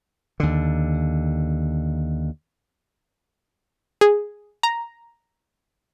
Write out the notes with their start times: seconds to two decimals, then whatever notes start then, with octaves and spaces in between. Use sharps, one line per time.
0.40 D#2 D3
4.01 G#4
4.63 A#5